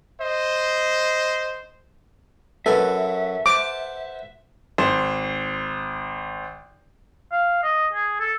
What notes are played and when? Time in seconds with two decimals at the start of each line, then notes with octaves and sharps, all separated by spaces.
0.21 C5 D#5
2.66 F#2 F#4 A4 B4 E5 G#5
3.46 C5 F#5 A5 D6
4.78 G#1 C5
7.32 F5
7.64 D#5
7.93 G#4
8.20 A4